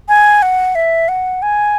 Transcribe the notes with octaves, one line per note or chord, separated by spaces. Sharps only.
G#5
F#5
E5
F#5
G#5